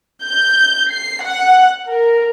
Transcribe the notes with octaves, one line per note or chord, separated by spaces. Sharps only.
G6
C7
F#5
A#4